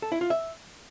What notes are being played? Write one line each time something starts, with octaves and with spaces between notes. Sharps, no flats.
A4
E4
F4
E5